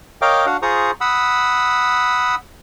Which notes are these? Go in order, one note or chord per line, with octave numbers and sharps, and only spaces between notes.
A#4 C#5 D#5 F5 G5 D6
D4 F#4 F5 F#5
F4 G#4 C5 A#5 C#6 D#6
F#5 B5 D#6 E6